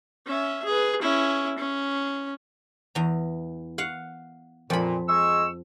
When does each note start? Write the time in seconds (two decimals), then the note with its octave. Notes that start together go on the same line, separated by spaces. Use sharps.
0.27 C#4 E5
0.65 G#4 B4
1.02 C#4 E4
1.59 C#4
2.95 E2 A#5
3.78 F5 F#5
4.70 F2 A#2 B5
5.08 G#3 C#6 E6